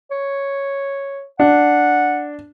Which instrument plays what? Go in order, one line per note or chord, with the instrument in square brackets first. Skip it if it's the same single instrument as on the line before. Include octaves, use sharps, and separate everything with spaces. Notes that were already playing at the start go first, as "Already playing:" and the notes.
[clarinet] C#5
[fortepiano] D4 [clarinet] F#5